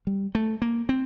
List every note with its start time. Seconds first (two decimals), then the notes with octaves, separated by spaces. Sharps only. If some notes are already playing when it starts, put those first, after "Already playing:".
0.07 G3
0.35 A3
0.62 A#3
0.89 C4